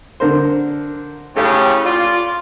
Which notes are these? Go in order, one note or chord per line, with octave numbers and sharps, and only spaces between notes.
D3 A#4 C5
A2 C#3 G4 A4
F4 D5